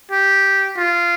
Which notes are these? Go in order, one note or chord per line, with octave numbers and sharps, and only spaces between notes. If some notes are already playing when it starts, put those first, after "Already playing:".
G4
F4